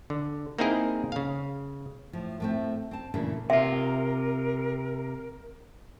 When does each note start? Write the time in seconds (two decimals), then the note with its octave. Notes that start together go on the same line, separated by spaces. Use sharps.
0.10 D3
0.58 A#3 C4 D#4 E4 G#4 A#4
1.12 C#3 F5
2.13 A2 F3
2.40 A2 A3 C4
2.91 C4 A5
3.14 A#2 C#3 E3 A3 D4
3.50 C3 F4 A#4 E5